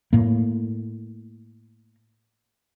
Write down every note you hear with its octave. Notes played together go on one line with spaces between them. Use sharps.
A2 A#3